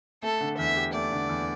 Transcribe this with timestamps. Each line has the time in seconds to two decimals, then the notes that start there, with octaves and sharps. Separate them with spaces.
0.23 A3 A4
0.40 D3
0.59 E2 E5
0.77 G4
0.94 A3 D5
1.12 D3
1.29 E2